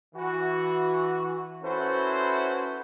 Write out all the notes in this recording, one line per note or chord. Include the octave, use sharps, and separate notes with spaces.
E3 F#4
C#4 E4 F#4 A4 B4 C5